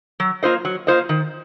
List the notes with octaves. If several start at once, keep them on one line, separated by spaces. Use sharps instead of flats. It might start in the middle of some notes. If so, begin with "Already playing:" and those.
F#3
A#3 F4 C5 D#5
F#3
A#3 F4 C5 D#5
D#3